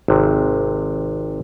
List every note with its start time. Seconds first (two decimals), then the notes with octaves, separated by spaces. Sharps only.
0.08 G#1 C3